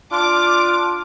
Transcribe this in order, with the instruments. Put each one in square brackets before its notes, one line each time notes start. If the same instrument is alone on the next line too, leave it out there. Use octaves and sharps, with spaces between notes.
[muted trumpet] D4 [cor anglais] F4 [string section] D6